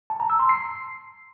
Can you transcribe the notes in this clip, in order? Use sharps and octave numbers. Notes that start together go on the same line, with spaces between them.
A5
A#5
E6
C6
C7